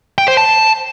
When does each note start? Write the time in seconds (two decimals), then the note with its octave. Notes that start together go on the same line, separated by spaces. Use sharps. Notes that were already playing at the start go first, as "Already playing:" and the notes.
0.18 G5
0.28 C5
0.37 A5